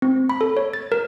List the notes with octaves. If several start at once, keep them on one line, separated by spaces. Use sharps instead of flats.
C4
B5
A4
C#5
A6
A#4